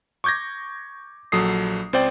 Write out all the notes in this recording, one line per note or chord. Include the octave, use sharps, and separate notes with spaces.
C#6 D6 G6 G#6 A#6
A#1 F#3 A4 D#6 C7
C#2 C4 C5 D5 G5